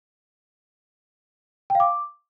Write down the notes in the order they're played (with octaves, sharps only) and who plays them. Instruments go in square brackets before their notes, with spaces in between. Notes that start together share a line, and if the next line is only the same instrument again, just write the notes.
[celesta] G5
F5
D6